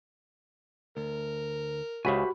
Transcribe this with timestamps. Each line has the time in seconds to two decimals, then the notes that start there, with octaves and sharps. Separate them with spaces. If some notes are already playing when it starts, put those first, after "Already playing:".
0.97 D2 A#4
2.05 C#2 C#3 F#4 G4 C5 E5 G#5 B5